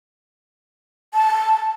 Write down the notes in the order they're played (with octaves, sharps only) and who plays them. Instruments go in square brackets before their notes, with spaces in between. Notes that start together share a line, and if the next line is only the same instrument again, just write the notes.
[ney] A5